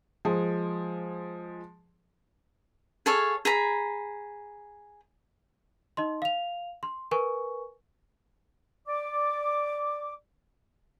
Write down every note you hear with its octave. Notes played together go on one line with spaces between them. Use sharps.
F3 G#3 G#4
G#4 A4 C#5 F5
G#4 A#5 B5
D#4 D#5 C6
F5 F7
C6
A#4 B4 G#5 C#6
D5 D6